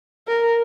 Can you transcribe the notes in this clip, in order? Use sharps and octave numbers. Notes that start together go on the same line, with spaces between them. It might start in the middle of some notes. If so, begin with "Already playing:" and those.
A#4